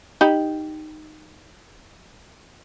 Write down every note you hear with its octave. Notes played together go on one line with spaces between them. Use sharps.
D#4 G4 B5